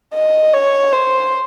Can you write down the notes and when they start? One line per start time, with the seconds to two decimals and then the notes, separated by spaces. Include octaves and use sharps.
0.14 D#5
0.53 C#5
0.93 C5